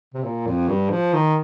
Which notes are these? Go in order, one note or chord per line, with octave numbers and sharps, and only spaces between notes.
C3
A#2
F2
G2
F3
D#3